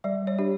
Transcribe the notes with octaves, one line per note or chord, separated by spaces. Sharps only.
G3 D5
C#5
D4 G4